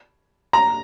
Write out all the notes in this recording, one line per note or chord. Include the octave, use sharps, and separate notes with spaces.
A#5